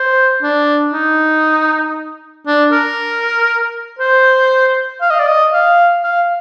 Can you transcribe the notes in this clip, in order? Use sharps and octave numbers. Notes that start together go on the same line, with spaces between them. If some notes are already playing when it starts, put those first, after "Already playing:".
Already playing: C5
D4
D#4
D4
A#4
C5
F5
D#5
D5
D#5
F5
F5